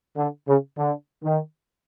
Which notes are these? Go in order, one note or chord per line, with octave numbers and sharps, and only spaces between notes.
D3
C#3
D3
D#3